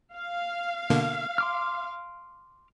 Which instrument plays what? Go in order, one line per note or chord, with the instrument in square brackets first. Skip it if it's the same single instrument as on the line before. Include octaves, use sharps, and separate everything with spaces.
[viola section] F5
[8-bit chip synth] B2 D3 A#3
[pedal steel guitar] C6 D6 F6